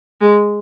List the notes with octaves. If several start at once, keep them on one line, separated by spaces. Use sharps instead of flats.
G#3